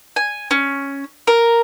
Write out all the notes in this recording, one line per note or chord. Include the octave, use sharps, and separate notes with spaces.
G#5
C#4
A#4